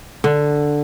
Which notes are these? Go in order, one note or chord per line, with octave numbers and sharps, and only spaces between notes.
D3